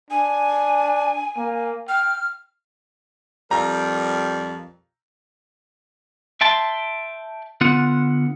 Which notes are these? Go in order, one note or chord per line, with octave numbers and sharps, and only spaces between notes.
D4 G#5
A#3
G5 F6
F2 G3 A#4 A#5
E5 G5 A5 C6
D3 B3 F4 F#5